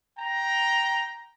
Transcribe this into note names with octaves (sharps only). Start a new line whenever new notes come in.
G5 A#5